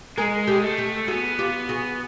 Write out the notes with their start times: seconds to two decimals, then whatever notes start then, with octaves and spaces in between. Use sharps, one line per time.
0.17 G#3 G#4 A#4
0.47 G4 A4
0.63 A3
0.78 G4 A4
1.08 B3 F#4 G#4
1.39 F4 G4
1.69 F#4 G#4